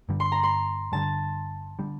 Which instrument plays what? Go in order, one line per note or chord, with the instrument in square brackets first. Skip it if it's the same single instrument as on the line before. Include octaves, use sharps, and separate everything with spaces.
[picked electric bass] G2 D3 G3
[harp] C6
A#5
C6
[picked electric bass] G2 D3 G3 [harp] A5
[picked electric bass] D3 G3